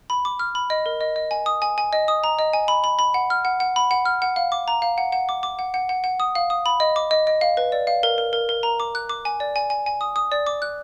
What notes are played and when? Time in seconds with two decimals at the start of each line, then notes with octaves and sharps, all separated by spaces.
0.10 B5
0.25 D6
0.39 F6
0.55 B5
0.70 D#5
0.86 A#4
1.01 D#5
1.16 D#5
1.31 G#5
1.46 D#6
1.62 G#5
1.78 G#5
1.93 D#5
2.08 D#6
2.24 A#5
2.39 D#5
2.53 G#5
2.68 B5
2.84 B5
2.99 B5
3.14 F#5
3.30 F6
3.45 F#5
3.60 F#5
3.76 B5
3.91 F#5
4.05 F6
4.22 F#5
4.36 F5
4.52 D6
4.68 A#5
4.82 F5
4.98 F#5
5.12 F#5
5.29 D6
5.43 D6
5.59 F#5
5.74 F#5
5.89 F#5
6.04 F#5
6.20 D#6
6.35 F5
6.50 D#6
6.66 B5
6.80 D#5
6.96 D6
7.11 D#5
7.27 D#5
7.41 F5
7.57 B4
7.72 D5
7.87 F5
8.03 A#4
8.18 A#4
8.33 A#4
8.49 A#4
8.63 A#5
8.80 D6
8.95 F#6
9.10 D6
9.25 G#5
9.40 D5
9.56 G#5
9.70 G#5
9.86 G#5
10.01 D#6
10.16 D#6
10.32 D5
10.47 D6
10.62 F#6